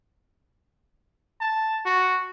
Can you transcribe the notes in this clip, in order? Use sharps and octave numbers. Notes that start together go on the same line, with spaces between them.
A5
F#4